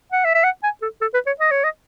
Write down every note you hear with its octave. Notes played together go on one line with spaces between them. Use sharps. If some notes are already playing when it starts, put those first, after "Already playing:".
F#5
E5
E5
F#5
G#5
A4
A4
B4
C#5
D#5
C#5
D#5